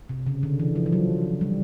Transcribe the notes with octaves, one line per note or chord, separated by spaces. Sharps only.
C3
C#3
D3
E3
F3
F3
F#3
G3